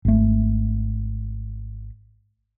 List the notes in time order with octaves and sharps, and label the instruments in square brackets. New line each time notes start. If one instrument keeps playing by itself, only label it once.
[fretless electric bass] G#1 A3